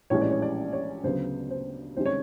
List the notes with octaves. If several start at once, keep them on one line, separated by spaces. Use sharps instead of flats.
A#1 A2 E3 G#3 C#4 C#5
D5
C#5
D5
C#5
D2 C#3 F#3 B3 C5
C5
C2 C3 D#3 G#3 C#4 C5
C#5